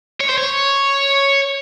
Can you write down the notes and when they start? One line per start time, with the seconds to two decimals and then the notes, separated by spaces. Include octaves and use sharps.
0.20 C#5
0.29 C5
0.38 C#5